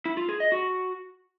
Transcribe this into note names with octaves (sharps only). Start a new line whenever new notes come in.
E4
F4
G#4
D#5
F#4